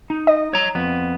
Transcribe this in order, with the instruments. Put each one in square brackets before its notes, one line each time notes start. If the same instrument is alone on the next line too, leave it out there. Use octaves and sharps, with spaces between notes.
[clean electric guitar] D#4
[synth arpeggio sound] D#5
[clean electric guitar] C#5 A#5
F2 B3